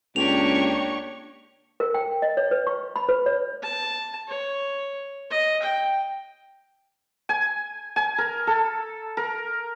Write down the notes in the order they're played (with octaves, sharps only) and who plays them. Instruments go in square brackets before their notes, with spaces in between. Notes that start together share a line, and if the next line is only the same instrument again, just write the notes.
[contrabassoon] C#2 [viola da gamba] A#3 D4 C#5 [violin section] G4 C#6 [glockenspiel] F7
[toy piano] A#4
G5
D#5
C#5
B4
C#6
B5
B4
C#5
[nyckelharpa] A5
C#5
D#5
G5
[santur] G#5
G#5
A#4
A4
A#4